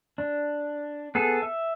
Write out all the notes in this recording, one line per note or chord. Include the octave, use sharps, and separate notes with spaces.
D4
B3 G#4 A4
E5